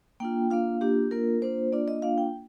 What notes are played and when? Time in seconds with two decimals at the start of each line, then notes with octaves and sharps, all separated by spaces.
0.20 A#3 D4 F4 G5
0.51 A#3 D4 F4 F5
0.81 A#3 D4 F4 G4
1.11 A#3 D4 F4 A#4
1.42 A#3 D4 F4 C5
1.72 A#3 D4 F4 D5
1.88 D#5
2.02 A#3 D4 F4 F5
2.18 G5